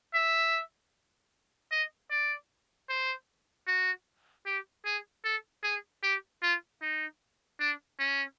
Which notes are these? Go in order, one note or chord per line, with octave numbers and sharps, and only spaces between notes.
E5
D#5
D5
C5
F#4
G4
G#4
A4
G#4
G4
F4
D#4
D4
C#4